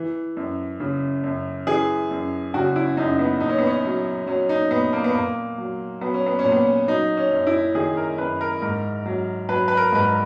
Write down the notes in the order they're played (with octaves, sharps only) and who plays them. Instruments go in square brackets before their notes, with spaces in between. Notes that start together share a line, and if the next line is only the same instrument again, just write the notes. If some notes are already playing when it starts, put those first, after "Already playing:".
Already playing: [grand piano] E3
F#2
C#3
F#2
E3 G#4
F#2
C#3 F#4
E4
F#2 D#4
B3
A#2 D#4
C#4
B3
C#4
F#3
F#3 C#4
D#4
A#2 B3
A#3
B3
A#2 A#3
F#3
F#3 B3
C#4
B3
C#4
A#2
B3
F#3 D#4
C#4
F#2
E4
D#3 G#4
A#4
F#2 B4
A#4
G#2 A#4
F#3
F#3 B4
B4
A#4
G#2 B4
A#4